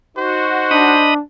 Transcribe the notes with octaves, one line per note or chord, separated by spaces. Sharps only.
D#4 F#4 C5
D4 D#5 B5 D#6